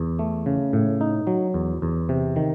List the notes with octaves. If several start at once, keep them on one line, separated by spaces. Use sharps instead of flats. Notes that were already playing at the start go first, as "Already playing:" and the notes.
Already playing: E2
A3
C#3
A2
D#4
F#3
E2
E2
C3
D#3